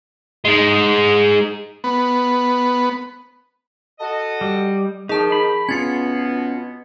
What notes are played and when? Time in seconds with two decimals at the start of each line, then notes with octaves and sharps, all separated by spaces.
0.45 G#3 D#4
1.84 B3
3.99 F#4 A4 D#5
4.41 G3
5.09 D#3 F3 D#4 G#4 A5
5.32 B5
5.69 B2 B3 C#4 F4 G#6 A6 C#7